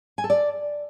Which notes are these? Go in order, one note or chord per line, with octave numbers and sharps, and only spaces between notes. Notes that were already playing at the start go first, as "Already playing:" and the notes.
G#5
A4
D5